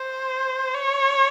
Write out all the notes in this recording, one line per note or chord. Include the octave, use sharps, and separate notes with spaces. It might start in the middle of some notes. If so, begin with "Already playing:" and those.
Already playing: C5
C#5